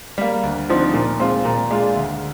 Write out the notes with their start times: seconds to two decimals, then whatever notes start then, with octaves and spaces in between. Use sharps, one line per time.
0.18 G3 A#3
0.43 D2
0.69 D3 F3 C4 D#4
0.94 A#2
1.19 G#3 C4 F4
1.45 A#2
1.70 G#3 D4 F4
1.95 D2